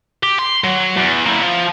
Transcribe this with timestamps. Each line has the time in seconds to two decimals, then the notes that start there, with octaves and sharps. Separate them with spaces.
0.23 G4
0.39 C6
0.64 F#3
0.97 E2
1.26 A#3 E4
1.41 F3